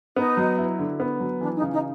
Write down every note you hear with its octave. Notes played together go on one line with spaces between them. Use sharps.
B3 D#4
F#3
E4
D3
B3
F#3
E3 D4
D#4
C#3
D#4